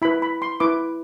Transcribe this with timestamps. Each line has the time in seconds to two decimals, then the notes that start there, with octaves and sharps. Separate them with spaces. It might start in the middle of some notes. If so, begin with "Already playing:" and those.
0.02 E4 B4 B5
0.22 B5
0.42 C6
0.60 E4 B4 D6